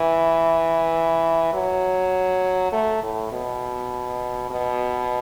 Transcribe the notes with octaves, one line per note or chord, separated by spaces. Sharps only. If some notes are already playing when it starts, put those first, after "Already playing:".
Already playing: E3
F#3
A3
A2
B2
B2